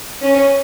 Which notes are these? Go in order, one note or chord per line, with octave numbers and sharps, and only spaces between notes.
C#4